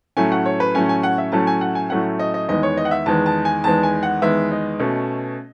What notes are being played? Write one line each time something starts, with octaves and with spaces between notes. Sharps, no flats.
A2 F#3 A3 C#4 G#5
F#5
C#5
B4
A2 F#3 A3 C#4 G#5
G#5
F#5
E5
A2 F#3 A3 C#4 A5
G#5
F#5
G#5
A2 F#3 A3 C#4 F#5
D#5
D#5
E2 D#3 G#3 B3 D#5
C#5
D#5
F#5
E5
E2 D#3 G#3 B3 A5
A5
G#5
E2 D#3 G#3 B3 A5
G#5
F#5
E2 D#3 G#3 B3 E5
D#5
B2 A3 C#4